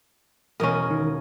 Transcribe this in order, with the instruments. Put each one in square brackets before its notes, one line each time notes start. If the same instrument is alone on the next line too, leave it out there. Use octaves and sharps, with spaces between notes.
[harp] E1 D#6 [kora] C#4 A#4
[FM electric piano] D#3